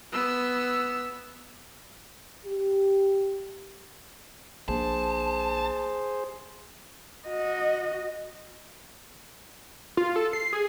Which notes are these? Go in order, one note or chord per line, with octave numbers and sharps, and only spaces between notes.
B3 E6
G4
A#1 A#3 D4 G#4 C5 A5
F#4 D#5
F4
A4
C7
G#4